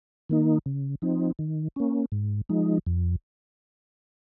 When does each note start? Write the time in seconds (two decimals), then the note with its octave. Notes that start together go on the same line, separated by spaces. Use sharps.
0.29 D#3 A#3 D#4
0.66 C#3
1.02 F3 C4 D#4
1.39 D#3
1.76 A#3 C#4
2.12 G#2
2.49 F3 G#3 D#4
2.86 F2